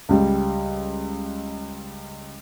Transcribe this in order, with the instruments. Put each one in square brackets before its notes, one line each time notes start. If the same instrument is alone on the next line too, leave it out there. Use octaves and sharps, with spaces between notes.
[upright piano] C#2 G3